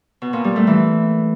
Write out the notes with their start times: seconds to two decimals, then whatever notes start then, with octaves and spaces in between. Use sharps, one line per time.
0.22 B2
0.33 A#2
0.44 G3
0.56 A3
0.67 E3